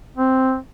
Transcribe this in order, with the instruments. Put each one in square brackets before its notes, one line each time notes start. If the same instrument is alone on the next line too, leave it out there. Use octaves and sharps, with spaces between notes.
[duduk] C4